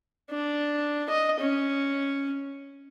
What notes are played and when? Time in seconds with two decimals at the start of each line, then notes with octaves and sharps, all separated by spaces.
0.31 D4
1.10 D#5
1.40 C#4